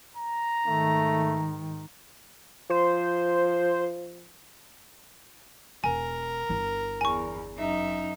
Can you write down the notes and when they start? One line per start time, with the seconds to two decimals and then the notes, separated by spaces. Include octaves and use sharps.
0.17 A#5
0.67 G#2 D#3 A3
2.70 F3 C5
5.84 E1 A#4 G#5
6.49 G1 E4
7.01 E2 G#5 C#6
7.59 F#2 D#4 E5